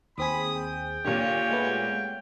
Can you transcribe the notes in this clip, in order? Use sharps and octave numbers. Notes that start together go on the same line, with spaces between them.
D#2 C4 G#4 B5 D#6
G5
A#2 D3 G4 C#5
G#3 A3 B3